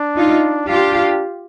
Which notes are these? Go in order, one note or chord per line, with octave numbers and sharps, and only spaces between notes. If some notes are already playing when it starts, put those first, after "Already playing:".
Already playing: D4
D#4 F4
D4 F4 G4